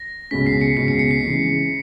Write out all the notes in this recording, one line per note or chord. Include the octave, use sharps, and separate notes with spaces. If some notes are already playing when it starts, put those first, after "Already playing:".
Already playing: A#6
C#2 B2 G#3 C#4 B6
C7
C#7
C#2 B2 G#3 C#4 C7
C#7
C#7
C7
C#3 E3 G#3 C#4